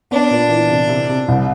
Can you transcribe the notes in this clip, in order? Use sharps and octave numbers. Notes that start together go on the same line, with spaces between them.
B3 D4
A#2
E3
C3
C3
C3
C2